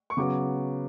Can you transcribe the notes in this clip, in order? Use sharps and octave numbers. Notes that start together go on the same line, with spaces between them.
C#6
C#3 F#3 B3 D6